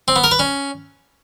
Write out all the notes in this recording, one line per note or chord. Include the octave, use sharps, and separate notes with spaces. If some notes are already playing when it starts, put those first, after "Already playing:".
C4
B3
A#4
B4
C#4